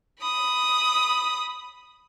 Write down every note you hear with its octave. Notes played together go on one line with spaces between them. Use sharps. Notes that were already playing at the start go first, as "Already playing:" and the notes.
B5 D#6